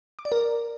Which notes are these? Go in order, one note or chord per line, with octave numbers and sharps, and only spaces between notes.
D6
D5
A#4